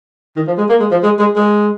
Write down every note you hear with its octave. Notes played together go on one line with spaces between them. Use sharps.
D#3
F3
G#3
A#3
G#3
F3
G#3
G#3
G#3